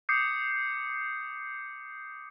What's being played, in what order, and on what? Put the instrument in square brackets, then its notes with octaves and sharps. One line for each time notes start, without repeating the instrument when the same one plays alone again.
[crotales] D6 D#6 G6 C7 C#7